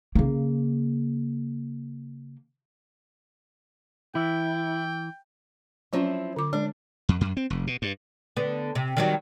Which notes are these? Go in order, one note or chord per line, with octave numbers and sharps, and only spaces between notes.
C#3 A#3
E3 E4 G5
F3 F#3 C4 C#4 E4 F4
D3 D6
G#3 D4
F2
F#2
C4
F1
B2
G2
D3 B3
C3
D#3 F#3 G3